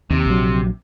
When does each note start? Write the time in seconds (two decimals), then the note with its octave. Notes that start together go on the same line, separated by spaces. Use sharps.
0.10 D#2 C3
0.26 A#1 F#3